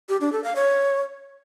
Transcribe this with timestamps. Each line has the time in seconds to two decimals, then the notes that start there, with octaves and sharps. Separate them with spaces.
0.09 G4
0.21 D4
0.32 A4
0.44 F5
0.56 C#5